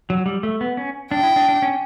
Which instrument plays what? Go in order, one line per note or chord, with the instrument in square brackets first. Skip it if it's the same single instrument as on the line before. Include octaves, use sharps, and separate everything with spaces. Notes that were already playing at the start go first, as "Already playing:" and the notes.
[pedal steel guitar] F#3
G3
A3
B3
C#4
[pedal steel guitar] D4 [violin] G5
[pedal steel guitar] E4
D4
D4
C#4